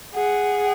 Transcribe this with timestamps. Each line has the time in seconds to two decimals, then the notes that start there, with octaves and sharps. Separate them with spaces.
0.14 G#4 F#5